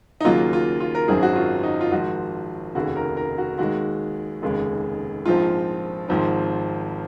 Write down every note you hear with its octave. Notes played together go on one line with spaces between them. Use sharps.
D#4
D#2 C#3 F#3 A#3 F4
F4
F4
A#4
G#1 F#2 D#3 F#3 C4 G#4
F#4
F4
D#4
F4
G#1 G#2 F3 F#4
F1 D#2 C#3 F#4
A#4
A#4
F#4
D#2 D#3 G#3 F#4
F1 D#2 C#3 G#3
A#1 G#2 F3 C4 F4
G#1 G#2 F3 C4